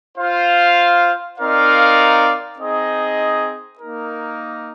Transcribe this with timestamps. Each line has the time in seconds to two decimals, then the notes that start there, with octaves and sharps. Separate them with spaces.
0.18 F4 C5 F5
1.38 C4 D#4 A#4 D5 F5
2.59 C4 D#4 G#4 D#5
3.79 A#3 D#4 A#4